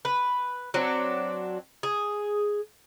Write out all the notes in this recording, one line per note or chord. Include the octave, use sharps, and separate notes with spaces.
B4
F#3 C4 D4
G#4